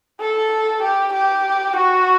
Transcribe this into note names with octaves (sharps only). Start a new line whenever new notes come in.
A4
G4
G4
F#4